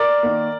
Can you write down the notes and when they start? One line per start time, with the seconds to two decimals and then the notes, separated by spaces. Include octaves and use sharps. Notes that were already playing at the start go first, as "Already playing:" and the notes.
Already playing: A#4 D5
0.23 D#3 A#3